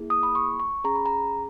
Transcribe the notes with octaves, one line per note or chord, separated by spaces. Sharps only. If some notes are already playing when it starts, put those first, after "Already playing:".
Already playing: A#3 E4 G#4
D#6
B5
C#6
C#6
C#4 G#4 A#5
B5
A#5